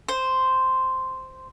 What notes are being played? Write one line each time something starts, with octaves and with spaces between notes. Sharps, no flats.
C5